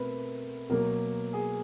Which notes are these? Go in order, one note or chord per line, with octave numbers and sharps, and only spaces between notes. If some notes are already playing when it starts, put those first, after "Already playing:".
Already playing: B2 A3 C4 A#4 B4
B2 F#3 A#3 A#4
G#4